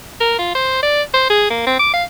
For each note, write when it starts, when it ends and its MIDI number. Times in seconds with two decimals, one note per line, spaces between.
0.20 0.34 70
0.39 0.54 65
0.55 0.79 72
0.82 1.02 74
1.14 1.28 72
1.30 1.46 68
1.50 1.65 58
1.66 1.75 60
1.79 1.90 86
1.93 2.04 77